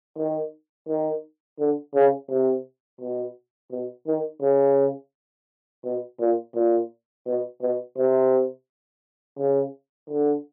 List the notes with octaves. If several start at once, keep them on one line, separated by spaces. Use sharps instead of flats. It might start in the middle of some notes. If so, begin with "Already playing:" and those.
D#3
D#3
D3
C#3
C3
B2
B2
D#3
C#3
B2
A#2
A#2
B2
B2
C3
C#3
D3